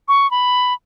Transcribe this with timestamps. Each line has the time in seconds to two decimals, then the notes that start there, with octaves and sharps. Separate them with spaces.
0.08 C#6
0.31 B5